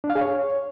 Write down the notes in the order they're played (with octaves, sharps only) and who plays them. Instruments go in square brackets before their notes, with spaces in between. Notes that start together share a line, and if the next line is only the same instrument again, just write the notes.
[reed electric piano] D4
F5
G#4
C#5